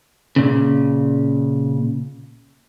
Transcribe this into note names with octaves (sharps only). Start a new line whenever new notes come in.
A#2 C#3